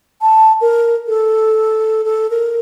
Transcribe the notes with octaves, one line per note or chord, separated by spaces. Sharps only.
A5
A#4
A4
A4
A#4